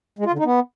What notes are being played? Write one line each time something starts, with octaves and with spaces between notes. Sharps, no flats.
G#3
F4
D3
D#4
B3